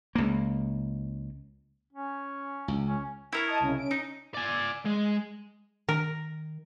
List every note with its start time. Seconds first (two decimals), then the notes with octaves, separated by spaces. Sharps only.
0.15 C#2 A#3
1.93 C#4
2.68 C#2
2.86 C#4
3.32 E4 A#4 C#5
3.47 D#5 A5 D#6
3.60 C2 C#3
3.78 C#4 D7
3.91 D#4
4.35 D5 G#5
4.85 G#3
5.89 D#3 A#4